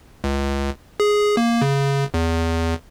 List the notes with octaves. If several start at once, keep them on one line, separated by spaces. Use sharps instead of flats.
C#2
G#4
A#3
C#3
E2